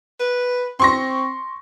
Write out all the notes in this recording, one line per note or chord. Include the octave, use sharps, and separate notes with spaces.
B4
C4 C6 C#6 A#6